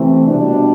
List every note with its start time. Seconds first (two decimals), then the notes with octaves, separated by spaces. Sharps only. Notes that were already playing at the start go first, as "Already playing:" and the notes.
Already playing: C3 E3 A3 C4
0.27 B2 G3 D4